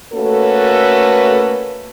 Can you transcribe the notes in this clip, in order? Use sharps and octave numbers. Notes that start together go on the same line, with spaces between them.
A3 A#3 C#4 F#4 A4 B4